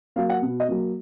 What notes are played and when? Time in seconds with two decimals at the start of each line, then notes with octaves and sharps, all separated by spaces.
0.16 F#3 A#3 F5
0.30 F#5
0.42 B2
0.60 D#5
0.68 F#3 A#3